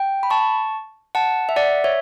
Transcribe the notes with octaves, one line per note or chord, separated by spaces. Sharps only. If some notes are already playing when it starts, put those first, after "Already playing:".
Already playing: G5
B5
A5 C#6
F#5 A5
E5
D5 F#5
C#5 E5